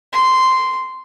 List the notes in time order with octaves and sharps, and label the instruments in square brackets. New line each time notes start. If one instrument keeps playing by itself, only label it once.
[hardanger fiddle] C6